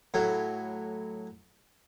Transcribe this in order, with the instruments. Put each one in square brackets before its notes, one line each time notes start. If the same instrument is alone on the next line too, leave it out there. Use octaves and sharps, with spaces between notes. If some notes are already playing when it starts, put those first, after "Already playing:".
[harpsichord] A2 F#3